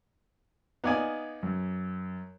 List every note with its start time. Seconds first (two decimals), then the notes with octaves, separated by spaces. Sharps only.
0.84 B3 D#4 D5 F5 G#5 G#6
1.43 F#2